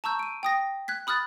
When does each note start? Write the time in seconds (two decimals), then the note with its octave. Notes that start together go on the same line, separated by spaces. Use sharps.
0.04 A5 A#5 C#6 E6 G6
0.19 D7 D#7
0.43 G5 D#6 A#6
0.88 F#6 G#6 B6
1.07 B5 D#6 F6 F#6 A6